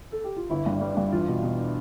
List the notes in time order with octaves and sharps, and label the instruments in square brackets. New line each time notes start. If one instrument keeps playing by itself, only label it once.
[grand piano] A4
G4
F4
[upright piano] G1 [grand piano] E4
[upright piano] G2 [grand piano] D4
[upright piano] G3
[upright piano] G2 [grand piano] D4
[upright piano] E2 [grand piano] F4
[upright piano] B2
B2